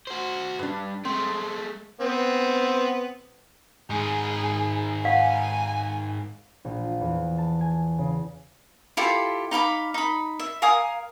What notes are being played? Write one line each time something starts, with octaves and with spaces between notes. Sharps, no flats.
F#4 C5
G2 D4 B4
G#3 A3 C4
B3 C4
G#2 D#3 G#4
F5 F#5 G#5
A#1
F4
E2
A5
G#5
C#3
E4 F4 G4 A4
D#4 F5 B5 D6
D#4 B5
E5
A#4 F5 G#5 D#6